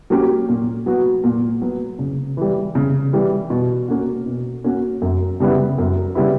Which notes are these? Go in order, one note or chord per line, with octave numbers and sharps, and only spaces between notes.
F#3 A#3 C#4 G4
A#2
F#3 B3 F#4
A#2
F#3 B3 F#4
C#3
E3 G3
C#3
E3 G3
B2
A#3 C#4 F#4
B2
A#3 C#4 F#4
F#2
C#3 G3 B3 E4
F#2
C#3 G3 B3 E4